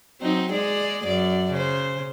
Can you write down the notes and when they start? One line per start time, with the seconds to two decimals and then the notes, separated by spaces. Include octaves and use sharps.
0.21 F#3 C4 D#4
0.52 G#3 G#4 D5
1.06 F#2 D5
1.52 C#3 C5